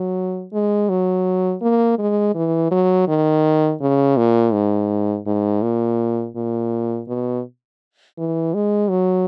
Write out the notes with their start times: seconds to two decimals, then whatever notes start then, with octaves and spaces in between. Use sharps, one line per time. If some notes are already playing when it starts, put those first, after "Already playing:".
Already playing: F#3
0.53 G#3
0.89 F#3
1.62 A#3
1.99 G#3
2.35 E3
2.71 F#3
3.08 D#3
3.81 C#3
4.17 A#2
4.53 G#2
5.26 G#2
5.62 A#2
6.36 A#2
7.08 B2
8.18 E3
8.54 G#3
8.90 F#3